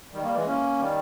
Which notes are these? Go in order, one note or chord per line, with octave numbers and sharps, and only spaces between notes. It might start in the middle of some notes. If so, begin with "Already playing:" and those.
D#3 G3
G3 A#3
E3 G#3
A#3 C#4
D#3 G3